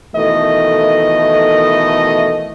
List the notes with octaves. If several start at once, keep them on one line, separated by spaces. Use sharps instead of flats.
B2 D#3 E3 A3 A4 D#5